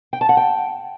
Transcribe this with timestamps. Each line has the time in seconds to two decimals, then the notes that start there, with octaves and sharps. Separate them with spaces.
0.13 G5
0.21 A5
0.29 F#5
0.37 G5